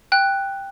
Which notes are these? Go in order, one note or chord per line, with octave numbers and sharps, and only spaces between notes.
G5 F#6